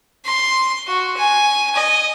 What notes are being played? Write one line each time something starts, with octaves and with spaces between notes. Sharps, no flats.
C6
F#4
G#5
D#5